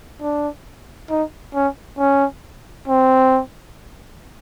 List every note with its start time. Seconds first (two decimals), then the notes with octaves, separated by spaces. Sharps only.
0.22 D4
1.10 D#4
1.55 C#4
1.99 C#4
2.88 C4